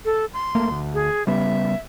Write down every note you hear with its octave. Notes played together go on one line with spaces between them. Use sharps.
A4
C6
D1 A3 A#3
D2
G#4
C#3 G3 B3 E5